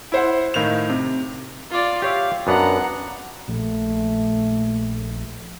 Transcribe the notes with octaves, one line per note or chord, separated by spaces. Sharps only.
E4 C5 F#5
A2 D#3 F5 F7
C3
F4 D5
G4 C#5 E5 F5
F#2 B3 D4 F#5 A#5
A#1 A3